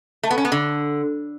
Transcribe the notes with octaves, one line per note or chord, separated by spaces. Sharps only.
A3
B3
C#4
B3
D3